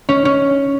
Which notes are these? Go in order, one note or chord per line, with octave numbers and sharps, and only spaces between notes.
C#4
C#4